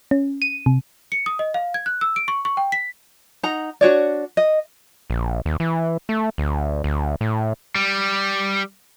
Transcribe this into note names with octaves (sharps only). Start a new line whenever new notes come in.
C#4
D#7
C3
C#7
D#6
D#5
F5
G#6
F#6
E6
D7
C#6
C#6
G5
B6
D#4 F#5 A#5
D4 F#4 C#5 D5
D#5
A#1
D#2
E3
A3
D2
D2
A2
G3